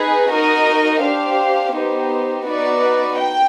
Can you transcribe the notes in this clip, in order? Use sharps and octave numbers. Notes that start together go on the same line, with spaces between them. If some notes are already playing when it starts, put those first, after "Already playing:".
Already playing: D#4 G#4 B4
D#4 F#4 A#4 D#5
D4 G4 C5 F5
B3 D#4 G4 C5
B3 D#4 F#4 B4 D5
G5